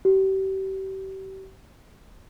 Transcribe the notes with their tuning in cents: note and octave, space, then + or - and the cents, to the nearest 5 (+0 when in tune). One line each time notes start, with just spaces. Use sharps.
G4 -35